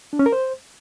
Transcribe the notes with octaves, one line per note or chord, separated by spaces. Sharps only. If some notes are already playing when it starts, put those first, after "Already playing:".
D4
C#4
A#4
C5